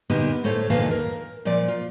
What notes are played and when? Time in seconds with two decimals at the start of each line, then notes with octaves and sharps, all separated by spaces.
0.10 A#2 D3 B3 D#4 G4 A#4
0.44 A2 A3 A4 C5 C#5 A5
0.70 D#2 A#2 D3 E3 F5 A5
0.91 A#4
1.45 A#2 F3 D5
1.68 F4